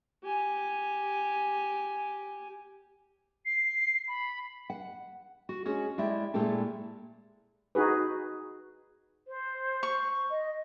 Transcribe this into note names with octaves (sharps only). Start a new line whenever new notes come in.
G4 G#5
C7
B5
F#5
F#4
G#3 C#4 F#4 G#4
G#3 E4 G4 D5 E5
A#2 G#3 A3 E4 G4 A4
D#4 F#4 G#4 B4
C5
C#6
D#5